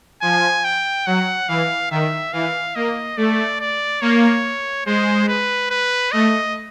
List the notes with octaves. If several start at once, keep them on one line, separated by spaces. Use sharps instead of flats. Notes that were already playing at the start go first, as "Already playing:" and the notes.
F3 G#5
G5
F#3 F#5
E3 F5
D#3 E5
E3 F5
A#3 D#5
A3 D5
D5
A#3 C#5
G#3 C5
B4
B4
A3 D#5